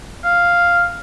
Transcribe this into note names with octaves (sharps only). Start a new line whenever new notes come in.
F5